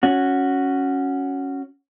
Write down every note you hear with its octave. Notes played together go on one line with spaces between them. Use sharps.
C#4 F#4